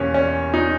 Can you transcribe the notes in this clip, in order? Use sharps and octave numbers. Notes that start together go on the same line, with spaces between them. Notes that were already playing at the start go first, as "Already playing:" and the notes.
Already playing: E2 B2 A#3 C#4 G4
C#4
D#4